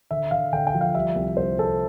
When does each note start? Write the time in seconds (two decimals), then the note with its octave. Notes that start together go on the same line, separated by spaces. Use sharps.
0.11 D3 E5
0.31 D3 F5
0.52 D3 G5
0.67 G5
0.74 F3
0.81 F5
0.95 G3 E5
1.16 C2
1.37 C2 C5
1.59 C2 A4